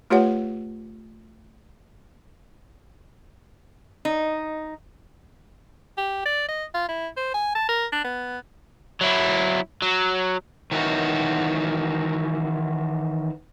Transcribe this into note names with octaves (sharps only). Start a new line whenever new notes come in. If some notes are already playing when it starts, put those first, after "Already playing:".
A3 F4 G4 B4 C#5 F#5
D#4
G4
D5
D#5
F4
E4
C5
G#5
A5
A#4
D4
B3
F#3 E4
F#3
D#3 E3 F#3 D#4 F#4